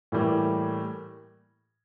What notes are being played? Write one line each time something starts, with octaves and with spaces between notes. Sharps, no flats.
A2 E3 G3 A#3